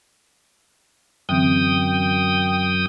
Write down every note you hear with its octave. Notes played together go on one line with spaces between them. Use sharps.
F#2 D3 E3 C4 G5 D#6